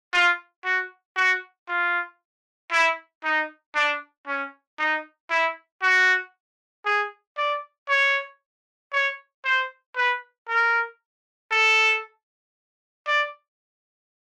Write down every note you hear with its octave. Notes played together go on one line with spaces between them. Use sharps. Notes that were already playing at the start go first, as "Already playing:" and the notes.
F4
F#4
F#4
F4
E4
D#4
D4
C#4
D#4
E4
F#4
G#4
D5
C#5
C#5
C5
B4
A#4
A4
D5